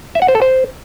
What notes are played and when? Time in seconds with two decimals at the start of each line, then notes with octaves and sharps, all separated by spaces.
0.15 E5
0.22 F#5
0.28 C5
0.35 A4
0.42 C5